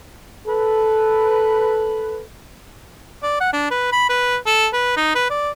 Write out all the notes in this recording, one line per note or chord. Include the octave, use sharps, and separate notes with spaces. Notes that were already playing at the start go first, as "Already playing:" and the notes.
A4 B4
D5
F#5
D4
B4
B5
B4
A4
B4
D#4
B4
D5